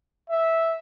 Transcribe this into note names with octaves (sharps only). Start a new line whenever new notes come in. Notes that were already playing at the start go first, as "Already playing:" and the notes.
E5